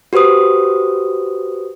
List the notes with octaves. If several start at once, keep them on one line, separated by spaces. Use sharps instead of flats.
F#4 G4 B4 C5 D#6